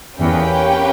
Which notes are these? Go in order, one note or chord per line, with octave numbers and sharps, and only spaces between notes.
E2 A#3 C#4 G4 B4 G5